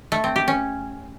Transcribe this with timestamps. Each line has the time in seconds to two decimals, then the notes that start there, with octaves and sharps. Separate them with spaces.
0.12 A3
0.24 C4
0.36 G4
0.48 C#4